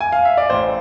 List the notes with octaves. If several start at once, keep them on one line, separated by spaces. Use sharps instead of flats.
G#5
F5
E5
D5
A1 C5